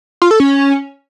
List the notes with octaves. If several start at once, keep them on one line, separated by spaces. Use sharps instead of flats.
F4
A4
C#4